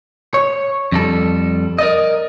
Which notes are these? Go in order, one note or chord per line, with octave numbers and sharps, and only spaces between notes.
C#5
F2 G3 A4
A#4 D5 D#5